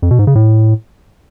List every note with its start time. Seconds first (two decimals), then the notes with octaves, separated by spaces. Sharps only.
0.02 F2
0.11 B2
0.19 G#2
0.27 C#3
0.35 A2